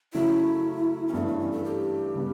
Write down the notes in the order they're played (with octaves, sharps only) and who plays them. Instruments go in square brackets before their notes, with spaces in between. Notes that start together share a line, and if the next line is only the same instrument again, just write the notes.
[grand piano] C#3 F#3 A3 C#4 [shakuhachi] E4
[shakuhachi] C#4
[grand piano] G2 E3 A3 D4 A4 [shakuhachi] B3
[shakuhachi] B3
C#4
A4
G4
[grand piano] C#3 G3 B3